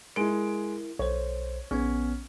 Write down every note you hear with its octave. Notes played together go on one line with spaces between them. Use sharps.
G#3 E4 A#4 D7
B1 C5 C#5
A#1 B3 C#4